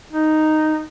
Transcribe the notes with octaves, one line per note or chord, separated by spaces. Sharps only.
D#4